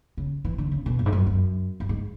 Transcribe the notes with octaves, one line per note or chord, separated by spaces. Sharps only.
C#3
E3
D3
C#3
B2
F#2
G#2
F#2
F#2
F#2
G#2